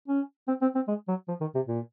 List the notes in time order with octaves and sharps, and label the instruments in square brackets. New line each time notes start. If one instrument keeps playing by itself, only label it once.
[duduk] C#4
C4
C4
C4
G#3
F#3
F3
D#3
C3
A#2